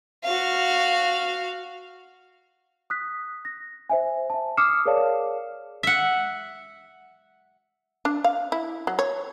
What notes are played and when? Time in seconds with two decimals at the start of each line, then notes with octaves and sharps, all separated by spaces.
0.24 F#4 F5
2.90 D#6 F#6 B6
3.45 A#6
3.90 C5 E5 G#5
4.30 E5 A5
4.57 D6 D#6 F6 C7 C#7 E7
4.85 G#4 A#4 C#5 D5 F5 A5
5.83 E5 F#5
8.05 D4
8.24 F5
8.52 E4
8.87 F#3
8.99 C#5